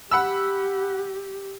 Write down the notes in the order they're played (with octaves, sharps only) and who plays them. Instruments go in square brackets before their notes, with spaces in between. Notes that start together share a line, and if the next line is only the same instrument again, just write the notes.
[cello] G4 [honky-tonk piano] F#5 B5 E6